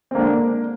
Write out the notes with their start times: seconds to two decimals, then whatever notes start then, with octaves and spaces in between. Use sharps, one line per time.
0.11 C4
0.15 D3 G#3 A#3 D4